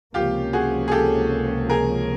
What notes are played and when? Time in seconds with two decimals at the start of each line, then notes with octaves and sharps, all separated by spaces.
0.14 C#2 C3 F3 A#3 C#4 F4 G4
0.53 F#4 G#4
0.88 G#4
0.92 G4 A4
1.70 G#4 A#4